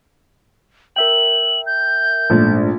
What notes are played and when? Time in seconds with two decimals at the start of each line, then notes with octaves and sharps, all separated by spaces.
0.96 A#4 E5 G5 F#7
1.66 G6
2.30 A#1 G#2 A3 D4